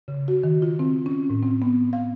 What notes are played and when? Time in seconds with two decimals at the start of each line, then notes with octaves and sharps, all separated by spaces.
0.08 C#3
0.28 F#4
0.43 D#3
0.62 F4
0.79 C4
1.06 C#4
1.30 A2
1.43 C4
1.62 B3
1.93 F5